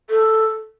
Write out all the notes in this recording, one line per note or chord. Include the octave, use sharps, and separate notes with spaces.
A4